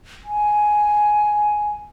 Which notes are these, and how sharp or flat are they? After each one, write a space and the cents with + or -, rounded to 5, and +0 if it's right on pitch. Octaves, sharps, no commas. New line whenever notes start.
G#5 +10